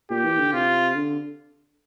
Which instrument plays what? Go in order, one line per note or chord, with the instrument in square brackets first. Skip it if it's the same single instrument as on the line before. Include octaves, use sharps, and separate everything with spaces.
[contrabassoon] A#2 [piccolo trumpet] G4
[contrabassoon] E3
D3
[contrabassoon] C3 [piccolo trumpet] F4
[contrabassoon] D3